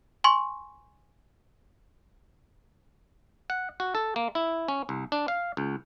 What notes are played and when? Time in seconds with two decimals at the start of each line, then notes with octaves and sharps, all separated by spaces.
0.24 G#5 C6 C#6
3.50 F#5
3.80 F#4
3.95 A4
4.16 A#3
4.35 E4
4.68 C#4
4.89 C2
5.12 D4
5.28 F5
5.57 C#2